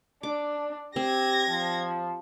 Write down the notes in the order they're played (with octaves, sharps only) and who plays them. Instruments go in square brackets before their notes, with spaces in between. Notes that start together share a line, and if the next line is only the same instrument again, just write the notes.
[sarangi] D4 [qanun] D6
[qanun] C4 [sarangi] G4 [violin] G#6 A#6
[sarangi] F3